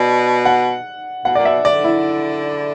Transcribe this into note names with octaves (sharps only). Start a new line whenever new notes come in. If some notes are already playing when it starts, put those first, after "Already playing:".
Already playing: B2 D5
F#5
B2 F#5
A#2 D5
B2 E5
D3 D5
E4